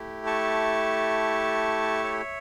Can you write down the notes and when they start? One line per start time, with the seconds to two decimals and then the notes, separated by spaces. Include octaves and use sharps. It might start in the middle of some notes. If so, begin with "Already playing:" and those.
Already playing: A3 E4 G4
0.26 A5 C#6
2.04 C#5 E5